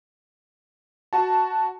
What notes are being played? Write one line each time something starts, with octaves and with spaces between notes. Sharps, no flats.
F#4 A5